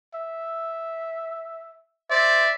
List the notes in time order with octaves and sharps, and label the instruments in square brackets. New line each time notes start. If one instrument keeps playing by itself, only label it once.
[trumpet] E5
[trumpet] C5 [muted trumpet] D5 [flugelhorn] E5